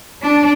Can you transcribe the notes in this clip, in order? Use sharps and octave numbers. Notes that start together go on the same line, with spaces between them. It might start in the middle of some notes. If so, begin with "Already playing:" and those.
D4